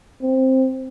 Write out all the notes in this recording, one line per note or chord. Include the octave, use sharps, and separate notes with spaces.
C4